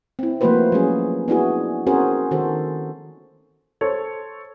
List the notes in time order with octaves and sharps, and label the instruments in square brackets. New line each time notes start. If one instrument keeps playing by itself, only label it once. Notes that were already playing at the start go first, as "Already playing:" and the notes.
[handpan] C4 E4
F3 A3 A#3 F#4 B4 C5
F#3 G#3 C#4 G#4
B3 D4 E4 F#4 G#4
C4 C#4 F#4 G#4 A#4 C5
D#3 F#4 A4 C5
[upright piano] A4 C5 C#5